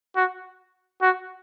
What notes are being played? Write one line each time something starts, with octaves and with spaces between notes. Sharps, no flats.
F#4
F#4